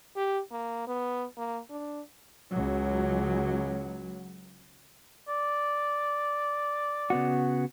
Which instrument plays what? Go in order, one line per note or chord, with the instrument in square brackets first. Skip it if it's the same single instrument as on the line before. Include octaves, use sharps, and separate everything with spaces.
[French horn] G4
A#3
B3
A#3
D4
[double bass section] C#2 F#3
[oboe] D5
[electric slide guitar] C#3 B3 F#4